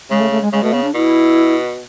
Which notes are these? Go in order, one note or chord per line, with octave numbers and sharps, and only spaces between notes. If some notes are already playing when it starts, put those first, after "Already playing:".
C#3 G#3
A3
A3
G#3
C#3 G#3
B2 A3
C#3 B3
D4
B2 E4